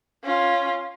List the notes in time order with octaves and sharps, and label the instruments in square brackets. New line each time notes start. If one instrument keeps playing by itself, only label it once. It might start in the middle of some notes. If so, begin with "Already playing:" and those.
[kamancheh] C#4 F4